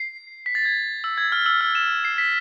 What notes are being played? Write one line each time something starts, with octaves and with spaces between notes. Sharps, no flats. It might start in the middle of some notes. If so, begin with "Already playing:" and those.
Already playing: C7
B6
A6
G#6
E6
G#6
F6
E6
F6
E7
C7
B6